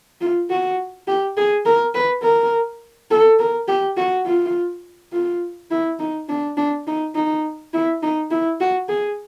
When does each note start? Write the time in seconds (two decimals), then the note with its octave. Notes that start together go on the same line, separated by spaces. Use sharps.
0.21 F4
0.50 F#4
1.08 G4
1.37 G#4
1.66 A#4
1.95 B4
2.23 A#4
3.11 A4
3.39 A#4
3.68 G4
3.97 F#4
4.26 F4
5.12 F4
5.71 E4
5.99 D#4
6.29 D4
6.57 D4
6.87 D#4
7.15 D#4
7.74 E4
8.03 D#4
8.31 E4
8.60 F#4
8.89 G#4